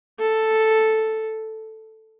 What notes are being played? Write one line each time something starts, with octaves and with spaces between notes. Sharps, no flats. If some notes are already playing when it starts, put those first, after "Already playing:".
A4